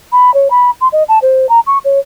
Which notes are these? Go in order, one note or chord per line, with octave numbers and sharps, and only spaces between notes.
B5
C#5
B5
C6
D#5
A5
C5
A#5
C#6
C#5